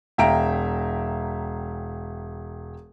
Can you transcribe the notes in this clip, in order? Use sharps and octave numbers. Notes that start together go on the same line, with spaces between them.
E1 E5 F5 G5 A#5 D7